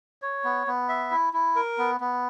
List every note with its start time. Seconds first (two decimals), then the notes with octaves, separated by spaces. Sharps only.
0.22 C#5
0.44 B3
0.67 B3
0.89 E5
1.11 E4
1.33 E4
1.56 A#4
1.78 B3
2.00 B3